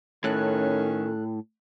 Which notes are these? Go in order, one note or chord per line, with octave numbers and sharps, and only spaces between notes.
A2 D#3 C#4 A4 F#6